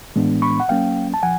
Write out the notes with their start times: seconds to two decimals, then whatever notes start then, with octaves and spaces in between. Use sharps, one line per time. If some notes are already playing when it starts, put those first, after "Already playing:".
0.16 A2 E3 G#3 B3 D4
0.42 B5 C#6
0.60 F#5
0.69 F#3 A#3 C#4 F5 G5
1.14 A5
1.23 F3 F#5 G#5